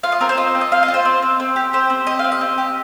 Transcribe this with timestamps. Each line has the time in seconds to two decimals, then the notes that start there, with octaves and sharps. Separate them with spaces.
0.03 F4 F5
0.12 D#5
0.20 C4 A#4
0.29 C5
0.37 F4 D#5
0.55 C4
0.61 D#5
0.71 F4 F5
0.83 D#5
0.88 F4
0.94 C5
1.05 C4
1.22 C4
1.40 C4
1.56 G4
1.73 G4 C5
1.90 C4
2.07 G4 D#5
2.19 F5
2.24 C4
2.32 D#5
2.41 C4
2.58 G4